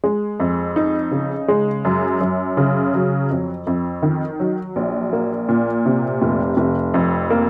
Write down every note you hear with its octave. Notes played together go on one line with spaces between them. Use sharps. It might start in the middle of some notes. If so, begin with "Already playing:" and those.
G#3
F2
D#4
C#3
G#3
F#2
F#2
C#3
F#3
F2
F2
D#3
F#3
A#1
A#3
A#2
C3
F1
F1
F2
A#3